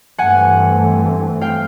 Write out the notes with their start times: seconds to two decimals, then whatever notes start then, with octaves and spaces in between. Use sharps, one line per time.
0.18 G2 E3 A3 C4 F#5 G#5
1.41 F5 G5